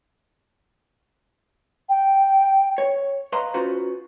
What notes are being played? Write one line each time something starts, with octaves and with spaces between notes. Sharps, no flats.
G5
C#5
B4 D#5 F5 A#5 C6
C#4 F4 F#4 B4 C5